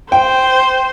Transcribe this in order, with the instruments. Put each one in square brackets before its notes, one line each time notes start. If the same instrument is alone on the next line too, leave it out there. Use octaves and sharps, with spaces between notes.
[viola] C5 [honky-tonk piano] G5